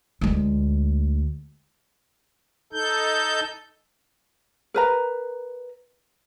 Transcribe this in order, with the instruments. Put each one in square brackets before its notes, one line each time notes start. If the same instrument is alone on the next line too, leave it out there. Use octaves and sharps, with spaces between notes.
[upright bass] D2 G#3
[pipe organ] D#4 A4 G6
[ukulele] A#4 B4 A#5